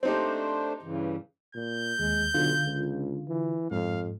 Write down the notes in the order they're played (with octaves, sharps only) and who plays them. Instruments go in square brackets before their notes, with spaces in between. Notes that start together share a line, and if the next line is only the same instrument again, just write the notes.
[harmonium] A3 D4 C5 [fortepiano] C4 D#4 G4
[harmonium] G2 C#3 E3
[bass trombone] A#2 [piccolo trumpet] G6
[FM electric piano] D#2 [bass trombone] G#3
[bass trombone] B1 [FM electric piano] D3 F4
[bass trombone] C#2
E3
[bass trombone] F2 [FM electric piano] G#2 [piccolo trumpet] F5